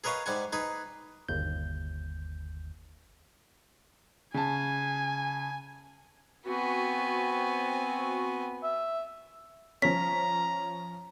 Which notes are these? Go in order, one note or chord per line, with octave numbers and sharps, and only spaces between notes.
G#4 A#4 B4 C#5 D#5 F5
G#2 G3 F#5 G#5
D#4 G#4 B4
G1 D#2 G6
C#3 G#5 A5
B3 C4 F#4 G#5
E5
F3 C#4 A#5 B6